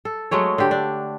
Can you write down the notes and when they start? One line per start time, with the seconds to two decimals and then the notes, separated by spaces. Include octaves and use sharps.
0.05 A4
0.31 F#3 G#3 A3 C#5
0.58 D3 G4
0.71 D4